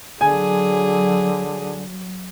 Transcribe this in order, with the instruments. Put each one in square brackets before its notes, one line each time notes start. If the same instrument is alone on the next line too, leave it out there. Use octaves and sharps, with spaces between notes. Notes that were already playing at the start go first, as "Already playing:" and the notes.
[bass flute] D3 [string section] F#3 [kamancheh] G#4 [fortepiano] G#5